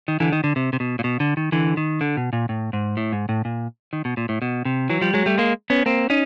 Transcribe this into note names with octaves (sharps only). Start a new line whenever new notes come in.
D#3
D3 E3
D#3
D3
C3
C3
B2
A#2
B2
D3
D#3
D3 E3
D#3
D3
B2
A#2
A2
G#2
A2
G#2
A2
A#2
D#3
B2
A#2
A2
B2
C3
E3 F#3
F3 G3
F#3 G#3
G3 A3
G#3 A#3
B3 C#4
A#3 C4
C#4 D#4